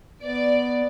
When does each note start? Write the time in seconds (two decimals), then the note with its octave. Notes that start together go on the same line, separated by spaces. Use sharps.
0.22 B3 D5